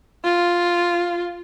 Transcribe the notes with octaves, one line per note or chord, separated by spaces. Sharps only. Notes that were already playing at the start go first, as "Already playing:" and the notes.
F4